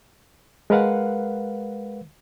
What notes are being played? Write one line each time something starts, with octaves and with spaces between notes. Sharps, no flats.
G#3 A#4 B4 F5 F#5